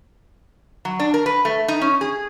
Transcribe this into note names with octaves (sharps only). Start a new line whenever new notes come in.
F#3
D4
A#4
B4
A3
D#4
C#4
G#4